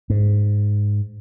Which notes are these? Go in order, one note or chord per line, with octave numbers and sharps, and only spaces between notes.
G#2